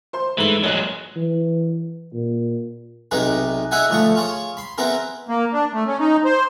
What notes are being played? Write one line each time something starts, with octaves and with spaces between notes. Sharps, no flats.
C5 C6
G#2 E3 A3 F#7
A#1 F#3 G#3 F#6
E3
A#2
B1 C3 D#4 G#4 B4
D#4 E4 G#4 E5 F#5 G#5
D2 F3 A3 C#6 D#6
F4 G#4 C#5
B5 C6
B3 C4 E4 G#4 A#4
A#3
D4
A3
C#4
D#4
C5